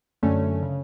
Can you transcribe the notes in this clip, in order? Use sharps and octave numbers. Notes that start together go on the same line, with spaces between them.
F#2 D3 A3 C#4
C#3